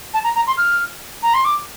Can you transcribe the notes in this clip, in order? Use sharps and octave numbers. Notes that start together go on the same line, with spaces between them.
A5
A#5
A#5
C6
F6
A#5
C6
D6